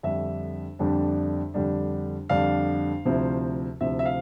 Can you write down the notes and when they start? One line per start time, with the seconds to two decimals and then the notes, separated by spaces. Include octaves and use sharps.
0.03 F2 D3 G3 D4 E5
0.79 F2 D3 G3 D4
1.54 F2 D3 G3 D4
2.29 F2 D3 G3 D4 F5
3.05 D2 C3 F3 C4 E4
3.81 D2 C3 F3 C4 E4 E5
3.99 E5
4.06 F5